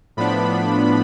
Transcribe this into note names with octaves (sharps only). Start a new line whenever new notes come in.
A2 F3 B3 D4 B5